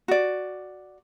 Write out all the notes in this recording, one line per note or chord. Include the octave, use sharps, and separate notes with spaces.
F#4 D5